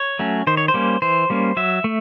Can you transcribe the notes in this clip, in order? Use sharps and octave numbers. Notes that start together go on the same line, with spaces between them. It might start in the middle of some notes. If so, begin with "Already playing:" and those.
Already playing: C#5
F#3 A3 C#4
D#3 C5
C#5
C5
G3 A#3 C#4
E3 C5
G3 A#3 C#4
F#3 E5
A3